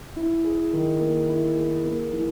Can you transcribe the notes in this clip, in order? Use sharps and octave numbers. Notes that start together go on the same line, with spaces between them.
E4
G#4
D#3
A#3
E4
G#4
A#3
E3